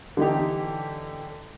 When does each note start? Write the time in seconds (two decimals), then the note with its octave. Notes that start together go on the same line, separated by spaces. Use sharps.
0.17 D3 E3 D#4 G4